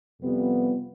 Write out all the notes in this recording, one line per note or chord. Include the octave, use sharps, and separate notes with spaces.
F2 C3 G3 B3 F4